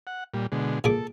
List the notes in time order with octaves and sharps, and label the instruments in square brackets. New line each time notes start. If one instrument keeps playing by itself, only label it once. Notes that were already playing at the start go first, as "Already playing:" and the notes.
[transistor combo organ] F#5
A#2 G3
B2 D3 G#3
[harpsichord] A#2 G#4 D6 [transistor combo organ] A4